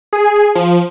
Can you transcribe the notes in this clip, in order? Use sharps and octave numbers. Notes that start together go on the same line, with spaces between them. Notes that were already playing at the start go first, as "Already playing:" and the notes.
G#4
F3